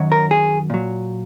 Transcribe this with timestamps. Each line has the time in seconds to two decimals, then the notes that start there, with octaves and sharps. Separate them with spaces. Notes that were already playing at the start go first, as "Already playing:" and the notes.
Already playing: F#2 D#3 F#3
0.12 A#4
0.31 G#4
0.70 A#2 F#3